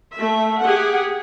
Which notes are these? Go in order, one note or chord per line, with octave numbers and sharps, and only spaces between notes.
A3 E5
G4 G#4 F#5